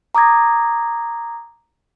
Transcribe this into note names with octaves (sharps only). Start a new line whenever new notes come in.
A#5 D6 D#6 G#6 A#6